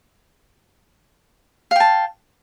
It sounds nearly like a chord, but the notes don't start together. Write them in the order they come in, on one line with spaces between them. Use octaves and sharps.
F5 G5 A5